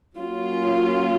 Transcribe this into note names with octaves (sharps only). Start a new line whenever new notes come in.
F#3 A#3 C#4 F4